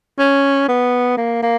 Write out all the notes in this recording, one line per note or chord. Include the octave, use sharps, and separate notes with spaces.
C#4
B3
A#3
A#3